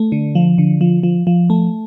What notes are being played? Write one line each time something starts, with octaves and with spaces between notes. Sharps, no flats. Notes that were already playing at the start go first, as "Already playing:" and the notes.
Already playing: A3
D3
F3
D3
F3
F3
F3
A3